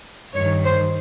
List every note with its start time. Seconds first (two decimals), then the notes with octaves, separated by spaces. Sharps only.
0.34 G2 D#3 C#5
0.64 C5